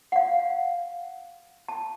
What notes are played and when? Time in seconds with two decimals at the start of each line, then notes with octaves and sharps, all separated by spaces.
0.12 F#5
0.16 F5
1.68 A5